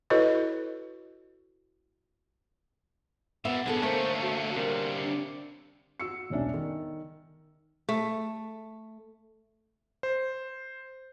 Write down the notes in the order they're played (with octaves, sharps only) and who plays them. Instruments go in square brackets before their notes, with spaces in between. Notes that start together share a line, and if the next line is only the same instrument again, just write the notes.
[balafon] E4 F#4 A4 B4 C#5 D#5
[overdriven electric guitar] A#2 G3 [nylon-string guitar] B3 E5 [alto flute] F#5
[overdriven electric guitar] D3 C#4 [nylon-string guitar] B3 G#4 A4
[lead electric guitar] A3 [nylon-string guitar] A#3 [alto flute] C5
[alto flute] F#4
[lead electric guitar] C3 G3 [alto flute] A#4
[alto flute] D4
[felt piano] F#4 E6 C#7
E1 C2 C#4 D4 E5
D#3
[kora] A3
[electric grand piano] C5